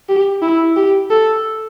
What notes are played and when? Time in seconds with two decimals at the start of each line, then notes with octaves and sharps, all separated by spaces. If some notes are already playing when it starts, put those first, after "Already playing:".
0.09 G4
0.42 E4
0.76 G4
1.10 A4